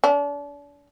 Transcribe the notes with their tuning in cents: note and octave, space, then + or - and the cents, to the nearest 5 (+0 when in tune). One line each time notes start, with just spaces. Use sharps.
D4 -35